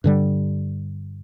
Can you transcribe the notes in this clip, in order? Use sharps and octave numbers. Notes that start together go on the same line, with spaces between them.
G2 D3 G3